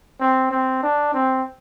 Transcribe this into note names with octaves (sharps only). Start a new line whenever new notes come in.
C4
C4
D4
C4